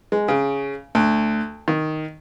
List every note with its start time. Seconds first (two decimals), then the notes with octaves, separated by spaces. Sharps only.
0.12 G#3
0.28 C#3
0.95 D2
1.68 D#3